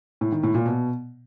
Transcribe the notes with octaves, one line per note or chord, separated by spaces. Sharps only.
A2
D#3
A2
A#2
B2